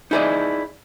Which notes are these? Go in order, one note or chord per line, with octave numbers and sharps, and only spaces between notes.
D#4 E4 G#4 A4 D5 D#5